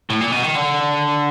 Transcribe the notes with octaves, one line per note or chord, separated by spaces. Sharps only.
A2
A#2
B2
D#3
D3